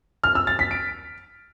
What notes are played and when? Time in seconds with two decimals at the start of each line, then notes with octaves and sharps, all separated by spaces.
0.24 F6
0.35 E6
0.47 A6
0.59 B6
0.71 D7